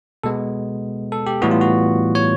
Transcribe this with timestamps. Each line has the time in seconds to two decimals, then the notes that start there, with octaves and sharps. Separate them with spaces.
0.24 B2 G#3 B3 A4
1.12 A4
1.26 G4
1.41 A2 E3 G3 B3 F#4
1.51 F4
1.61 F#4
2.15 C#5